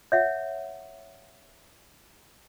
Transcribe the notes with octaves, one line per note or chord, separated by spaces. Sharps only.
C#5 E5 F#5